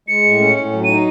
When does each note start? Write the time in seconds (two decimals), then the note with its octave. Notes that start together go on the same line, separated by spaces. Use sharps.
0.08 G#3 C#7
0.25 A2
0.40 C#4
0.57 A2
0.72 F#3
0.84 D#4 D#7